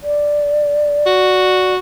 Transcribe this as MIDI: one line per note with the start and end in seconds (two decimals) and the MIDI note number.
0.03 1.74 74
1.06 1.79 66